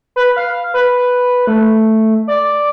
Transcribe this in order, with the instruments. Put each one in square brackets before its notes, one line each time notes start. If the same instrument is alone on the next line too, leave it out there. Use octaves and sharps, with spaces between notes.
[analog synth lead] B4
F5
B4
A3
D5